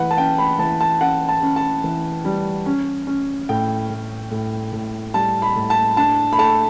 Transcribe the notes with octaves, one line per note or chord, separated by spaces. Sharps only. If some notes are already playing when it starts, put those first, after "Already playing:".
Already playing: E3 B4 F#5
A5
C#4 G5
B5
E3 A5
A5
C#4 F#5
A5
C#4
A5
E3
G3
C#4
C#4
A2 G5
A2
A2
A2
G3 A5
B5
A2
A5
D4 A5
B5
A3 A5